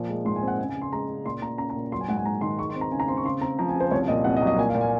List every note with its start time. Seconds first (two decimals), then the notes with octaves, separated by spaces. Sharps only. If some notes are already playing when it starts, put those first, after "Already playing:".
Already playing: A#2 F3
0.09 G#3
0.25 G#2 C6
0.36 G#5
0.42 C4
0.48 F#5
0.59 C#3 G#5
0.69 G#5
0.76 C#3
0.82 C6
0.93 G#3 A#5
1.08 C#3
1.25 A#2 C6
1.42 A#2 A#5
1.58 C#4 A#5
1.70 A#5
1.76 A#2
1.92 F#3 C6
2.01 G#5
2.08 G#2 F#5
2.17 G#5
2.25 G#2 A#5
2.41 D#3 C6
2.59 G#3 C#6
2.69 C6
2.75 C4
2.81 A#5
2.91 C#3 G#5
3.00 A#5
3.08 C4 C6
3.17 C#6
3.25 C#3 C6
3.41 C4 A#5
3.59 F3 A#5
3.69 G#5
3.75 C#3 C5
3.91 C2 C#5
4.08 A#2 D#5
4.24 C2 F#5
4.37 D#5
4.42 F#3
4.47 D#5
4.58 A#2 G#5
4.69 F5
4.75 A#2
4.81 G#5